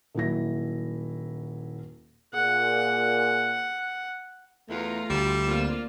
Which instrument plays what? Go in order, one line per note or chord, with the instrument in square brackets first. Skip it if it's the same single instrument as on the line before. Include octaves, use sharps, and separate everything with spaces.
[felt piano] D#1 F#3 E4 A#6
[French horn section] A#2 G#4 [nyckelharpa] F#5
[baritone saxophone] E2 [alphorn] A3 [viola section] F4 A#5
[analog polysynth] D2 E7 [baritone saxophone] G3
[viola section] A#3 F4 D5 [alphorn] C4